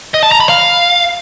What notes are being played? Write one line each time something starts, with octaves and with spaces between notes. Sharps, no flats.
D#5
A5
A#5
B5
F5